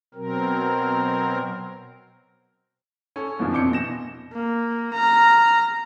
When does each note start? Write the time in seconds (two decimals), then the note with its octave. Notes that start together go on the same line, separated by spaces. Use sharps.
0.14 B2 F#3 C4 A#4
3.16 C#4 A4 C#5
3.39 F#2 B2 E3 F3 D4
3.52 F2 C3 D6 G6 C#7
3.71 B2 E3 A#6 E7
4.33 A#3
4.93 A#5 F6